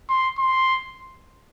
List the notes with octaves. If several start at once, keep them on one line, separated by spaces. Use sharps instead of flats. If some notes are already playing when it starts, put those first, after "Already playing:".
C6
C6